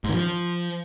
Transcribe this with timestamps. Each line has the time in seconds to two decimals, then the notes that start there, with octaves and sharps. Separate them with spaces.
0.04 G#2
0.09 D#3
0.14 F3